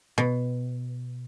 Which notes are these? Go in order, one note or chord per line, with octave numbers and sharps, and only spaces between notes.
B2